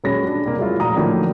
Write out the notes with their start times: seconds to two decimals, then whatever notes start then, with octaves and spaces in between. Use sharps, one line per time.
0.04 D#1 F#3 G#3 C#4 B5 A#6
0.26 D4
0.46 C2 G2 A#3
0.58 F#3 G#3 E4 F4
0.80 A#1 A2 A#5 D#6
0.96 A2 D3 D#3 F3 F#3 A#3